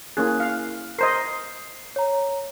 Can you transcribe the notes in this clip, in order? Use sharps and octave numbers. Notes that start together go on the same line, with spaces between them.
A#3 C#4 E4 G#4 A#4 F#6
F5
A#4 C5 D#5 C7
C#5 A#5